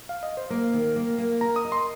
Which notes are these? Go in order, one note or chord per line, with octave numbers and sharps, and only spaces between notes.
F5
D#5
C5
A#3 A#4
D#3
A#3
A#3
A#4 A#5
D#6
D#5
C6